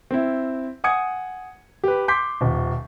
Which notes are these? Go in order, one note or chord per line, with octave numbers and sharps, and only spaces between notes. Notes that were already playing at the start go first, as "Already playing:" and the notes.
C4 E4
F#5 G#5 D#6 G#6 C#7
G4 B4
C6 D6 G6 B6 C7
D#1